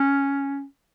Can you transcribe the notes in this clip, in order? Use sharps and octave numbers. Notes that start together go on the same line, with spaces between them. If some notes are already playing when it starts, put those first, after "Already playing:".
Already playing: C#4